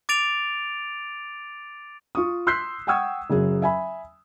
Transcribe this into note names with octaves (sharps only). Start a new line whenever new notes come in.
D6 A6 D7 F7
F4 C#6 D#6
C6 E6 F#6 G6 B6 C7
F#5 G5 C#6 D#6 E6 G#6
F#1 F#3 G#4
E5 G#5 B5